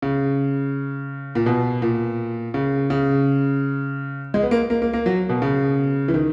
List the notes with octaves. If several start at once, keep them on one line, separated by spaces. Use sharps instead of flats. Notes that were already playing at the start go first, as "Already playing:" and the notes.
C#3
A#2
B2
A#2
C#3
C#3
G#3
B3
A#3
A#3
A#3
A#3
F#3
B2
C#3
E3
D#3